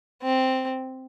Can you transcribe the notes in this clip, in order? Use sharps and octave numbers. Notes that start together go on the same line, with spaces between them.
C4